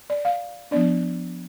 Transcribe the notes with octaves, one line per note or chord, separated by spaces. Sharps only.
D5
F5
F3 B3 D4 D5